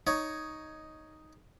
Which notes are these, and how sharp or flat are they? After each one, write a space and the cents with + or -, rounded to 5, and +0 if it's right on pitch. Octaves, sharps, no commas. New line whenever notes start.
D#4 +0 C#5 +5